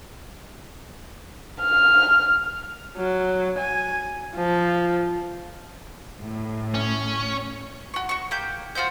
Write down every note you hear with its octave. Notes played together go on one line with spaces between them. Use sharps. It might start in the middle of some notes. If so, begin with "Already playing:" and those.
F6
F#3
G#5
F3
A2
C#4
F#4 C#6
F#4 C#6
A#3 G4 G6
F4 F#4 C5 G6